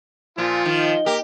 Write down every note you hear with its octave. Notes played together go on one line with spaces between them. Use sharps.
A#2 F3 F4
D#3
A#3 G4